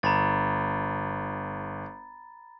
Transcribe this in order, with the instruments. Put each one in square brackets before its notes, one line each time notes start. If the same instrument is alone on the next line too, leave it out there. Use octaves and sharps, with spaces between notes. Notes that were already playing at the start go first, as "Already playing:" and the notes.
[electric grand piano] G1 [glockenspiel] A#5 B5 A6